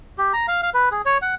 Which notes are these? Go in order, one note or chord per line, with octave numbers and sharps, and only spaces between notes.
G4
A#5
F5
F5
B4
G#4
C#5
F#5